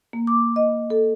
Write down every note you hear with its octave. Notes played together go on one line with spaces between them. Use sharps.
A#3
D6
D#5
A4